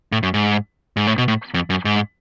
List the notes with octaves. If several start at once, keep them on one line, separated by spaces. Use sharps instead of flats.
A2
F#2
G#2
G#2
A2
B2
A2
F2
F#2
G#2